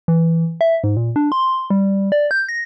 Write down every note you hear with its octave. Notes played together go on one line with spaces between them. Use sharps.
E3
E5
G#2
A#2
D4
C6
G3
D5
G6
A#6